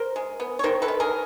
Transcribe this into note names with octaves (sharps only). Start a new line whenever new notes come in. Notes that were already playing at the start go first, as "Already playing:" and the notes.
Already playing: A#4 C5
G#3
B3
C#5
D#3 A#4 C5
A4 B4
D#3
G#4 A#4